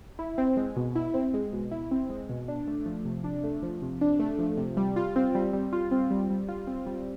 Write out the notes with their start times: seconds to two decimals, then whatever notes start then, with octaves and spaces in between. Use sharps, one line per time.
0.19 E4
0.38 C4
0.57 G#3
0.76 B2
0.95 E4
1.14 C4
1.34 G#3
1.53 B2
1.71 E4
1.91 C4
2.10 G#3
2.29 B2
2.48 D4
2.67 A3
2.86 F3
3.05 C3
3.24 D4
3.43 A3
3.63 F3
3.82 C3
4.01 D4
4.19 A3
4.39 F3
4.57 C3
4.77 G3
4.96 F4
5.16 C4
5.35 G3
5.53 G3
5.73 F4
5.91 C4
6.10 G3
6.30 G3
6.49 F4
6.67 C4
6.86 G3